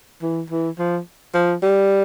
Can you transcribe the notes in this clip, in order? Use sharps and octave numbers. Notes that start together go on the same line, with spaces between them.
E3
E3
F3
F3
G3